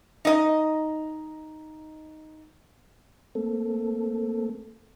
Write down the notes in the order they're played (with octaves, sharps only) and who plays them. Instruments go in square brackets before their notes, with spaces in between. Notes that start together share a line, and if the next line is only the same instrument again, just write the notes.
[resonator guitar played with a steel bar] D#4 D#5
[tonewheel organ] A3 A#3 C4 A4